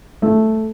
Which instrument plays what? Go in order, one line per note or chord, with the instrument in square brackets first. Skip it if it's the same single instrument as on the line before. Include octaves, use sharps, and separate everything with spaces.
[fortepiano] A3